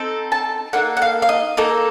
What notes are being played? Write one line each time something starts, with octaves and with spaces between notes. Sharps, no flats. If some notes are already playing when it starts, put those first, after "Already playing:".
Already playing: C4 D#4 A4
A5
A#3 D#4 A4 F#5
F#5
F5
F5
D#5
A#3 D#4 A4